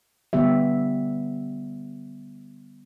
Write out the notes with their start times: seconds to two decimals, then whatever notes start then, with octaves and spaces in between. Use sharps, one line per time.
0.33 D3 G3 B3 G4 E5